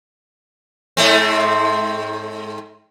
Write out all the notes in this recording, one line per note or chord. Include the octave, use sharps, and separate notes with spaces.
G#2 A3 C4